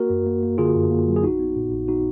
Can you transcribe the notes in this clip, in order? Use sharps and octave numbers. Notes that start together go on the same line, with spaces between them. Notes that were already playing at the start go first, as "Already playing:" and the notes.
Already playing: A#3 F#4 A#4
F#2
A#3
A#3
D3 F4 G#4
F#2
A#3
F#3
G#4
A#1 D#4 F#4
B3
A#2
A#1
B3 D#4 F#4